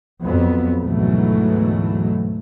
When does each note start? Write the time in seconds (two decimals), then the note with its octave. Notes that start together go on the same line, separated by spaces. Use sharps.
0.23 F2 F#3 B3
0.82 D2 G#2 B2 E3 F#3 A3